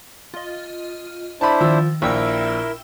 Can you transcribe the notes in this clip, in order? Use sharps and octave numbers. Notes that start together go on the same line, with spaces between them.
F4 D#5
D4 E4 C5 A5 B5
D#3 F3 E6
A#1 E4 A#4 E5 G5 E6